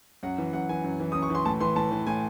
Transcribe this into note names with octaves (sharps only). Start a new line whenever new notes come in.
F#2 F#5
E3
F#2 F#5
E3 G#5
F#2
E3
F#2 D#6
C#6
E3 C6
A2 A5
E3 C6
A2 A5
E3
A2 G#5